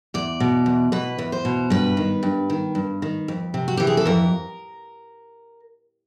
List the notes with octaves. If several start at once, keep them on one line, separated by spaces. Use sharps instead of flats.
E2 D5
B2
E2
B2 B4
E2
C5
B2
G2 B4
D#3
G2
D#3
G2
D#3
F2
C3
F#4
E3 G4
G#4
A4
F2 A#4